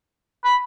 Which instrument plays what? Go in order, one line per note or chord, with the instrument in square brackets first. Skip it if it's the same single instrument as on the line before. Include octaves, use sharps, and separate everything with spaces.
[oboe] B5